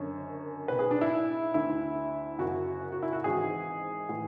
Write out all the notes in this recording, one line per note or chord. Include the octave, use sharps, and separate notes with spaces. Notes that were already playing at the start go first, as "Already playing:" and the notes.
Already playing: F#1 F#2 D3 C#5
B1 B2 B4
G#4
D4
E4
D2 D3 E4
F#1 F#2 C#3 F#4
F#4
E4
F#4
G#1 G#2 E3 G#4
A2 E3